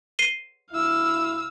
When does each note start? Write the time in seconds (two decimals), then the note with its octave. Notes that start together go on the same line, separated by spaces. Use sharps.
0.19 C7 D#7 G7
0.71 D2 E4 F5 E6